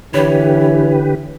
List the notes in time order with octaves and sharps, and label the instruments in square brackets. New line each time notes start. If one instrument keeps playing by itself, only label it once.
[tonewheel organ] D3 G4 B4 [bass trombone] E3 [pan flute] C#5